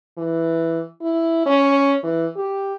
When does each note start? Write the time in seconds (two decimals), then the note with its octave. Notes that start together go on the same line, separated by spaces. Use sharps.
0.17 E3
1.02 E4
1.46 C#4
2.03 E3
2.37 G4